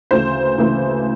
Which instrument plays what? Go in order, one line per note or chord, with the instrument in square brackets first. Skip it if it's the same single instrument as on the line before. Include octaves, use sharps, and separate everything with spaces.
[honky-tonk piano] D2 C#3 E3 A3 C5
D2 C#3 E3 A3